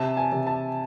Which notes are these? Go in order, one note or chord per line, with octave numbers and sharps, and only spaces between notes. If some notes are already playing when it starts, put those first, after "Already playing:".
Already playing: C3 A5
G#5
C3
A5